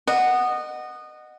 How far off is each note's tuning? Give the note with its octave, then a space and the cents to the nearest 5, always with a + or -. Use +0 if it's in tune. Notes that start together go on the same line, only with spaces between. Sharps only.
D#5 -20 F#5 +0